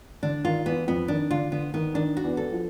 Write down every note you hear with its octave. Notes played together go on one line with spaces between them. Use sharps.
D3 D4
D#3 F4
E2 E3 B3
F2 F3 B3
D#3 D4
D3 F4
D3 B3
D#3 B3
D#3 D4
F#4
E2 E3
A4
F3